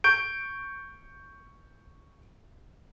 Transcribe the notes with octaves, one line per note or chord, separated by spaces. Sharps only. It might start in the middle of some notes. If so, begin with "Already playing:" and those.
C#6 G6 D7